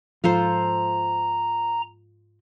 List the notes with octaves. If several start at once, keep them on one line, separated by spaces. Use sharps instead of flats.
G#2 F3 F4 A4 C5 A#5